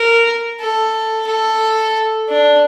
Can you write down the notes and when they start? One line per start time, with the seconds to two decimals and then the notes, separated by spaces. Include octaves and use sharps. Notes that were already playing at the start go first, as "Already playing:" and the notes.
Already playing: A#4
0.60 A4
1.27 A4
2.29 D4